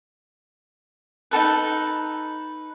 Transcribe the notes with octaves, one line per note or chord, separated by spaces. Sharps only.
D#4 F#4 A4 B4